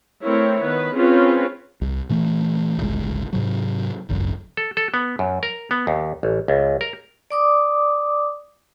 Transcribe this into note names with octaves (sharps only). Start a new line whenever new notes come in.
A3 C4 E4 A#4 C#5
D#3 B3 B4
C4 C#4 F4 G#4 B4 C#5
C2
A#2 E3 A3
D1 G1 C#2 G#3
G#2 C3 F#3
D1 G#1 C#2 F#2
A4
A4
B3
F#2
A#4
B3
D#2
A1
C#2
A#4
D5 D6 D#6